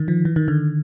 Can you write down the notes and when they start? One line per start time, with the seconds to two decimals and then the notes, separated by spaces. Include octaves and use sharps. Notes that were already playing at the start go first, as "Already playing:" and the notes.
Already playing: D3 D#3
0.08 F3
0.25 E3
0.36 D#3
0.48 D3